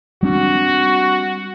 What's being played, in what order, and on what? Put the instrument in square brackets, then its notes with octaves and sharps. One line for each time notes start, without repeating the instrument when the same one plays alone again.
[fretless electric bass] G3 C4 D4 [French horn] F#4